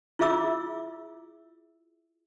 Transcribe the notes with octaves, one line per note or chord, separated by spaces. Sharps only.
E4 F4 G#4 E5 D6 E6